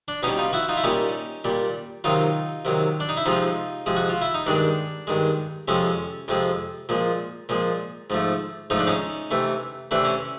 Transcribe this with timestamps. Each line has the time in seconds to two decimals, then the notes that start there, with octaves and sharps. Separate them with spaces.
0.08 D4
0.23 B2 G3 C#4 D#4
0.38 D#4 F4
0.53 E4 F#4
0.68 D#4 F4
0.77 E4
0.83 A#2 G3 C#4 D#4
1.44 A#2 G3
2.04 C3 D#3 F#3 D#4 F4
2.65 C3 D#3 F#3
3.00 D4
3.09 D#4
3.17 E4
3.25 C3 F3 G#3 D#4 F4
3.86 C3 F3 G#3
3.96 F#4
4.09 F4
4.21 E4
4.34 D#4
4.46 G2 D#3 G#3 D4
5.07 G2 D#3 G#3
5.68 F2 C3 F3 G#3 C#4
6.28 F2 C3 F3 G#3
6.89 A#2 F3 G#3
7.49 A#2 F3 G#3
8.10 G#2 F3 A3
8.70 G#2 F3 A3 D#4
8.79 D4
8.87 C#4 D#4
9.31 C3 E3 A3
9.91 C3 E3 A3 D4
10.05 C#4